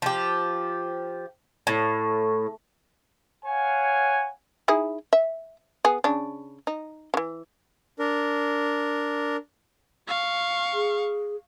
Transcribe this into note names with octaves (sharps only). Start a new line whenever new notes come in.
F3 G4
A2
C#5 F5 F#5 G#5
D#4 E4 G#4
E5
B3 G#4
C#3 D4
D#4
C#3 E3
D4 A#4
F5 C#6
G#4